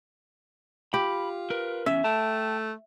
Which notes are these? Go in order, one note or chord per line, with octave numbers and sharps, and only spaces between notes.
F4 G4 B5
A#4 B4
E2 C#4 E5
A3 G5 A5